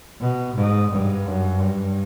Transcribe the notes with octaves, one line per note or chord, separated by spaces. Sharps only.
B2
G#2
G2
F#2
G2